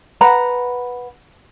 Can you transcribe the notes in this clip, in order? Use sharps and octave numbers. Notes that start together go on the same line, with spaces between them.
B4 F#5 A#5 B5